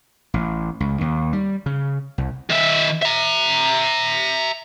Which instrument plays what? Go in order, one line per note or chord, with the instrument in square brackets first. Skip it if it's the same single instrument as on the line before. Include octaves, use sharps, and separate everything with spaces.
[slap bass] A1
C#2
D#2
G3
C#3
C2
[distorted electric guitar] D#3 E5
E5 A#5